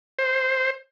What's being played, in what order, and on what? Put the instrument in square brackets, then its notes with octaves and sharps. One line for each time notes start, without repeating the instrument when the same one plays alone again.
[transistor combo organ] C5